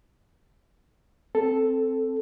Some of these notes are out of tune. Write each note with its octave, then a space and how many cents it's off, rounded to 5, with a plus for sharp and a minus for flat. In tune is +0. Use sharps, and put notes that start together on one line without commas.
C4 +0 A4 +0